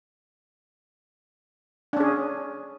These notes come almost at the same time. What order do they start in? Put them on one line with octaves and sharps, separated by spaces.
D4 C#4 G#4